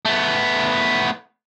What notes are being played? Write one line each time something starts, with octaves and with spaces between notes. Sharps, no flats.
A3 B3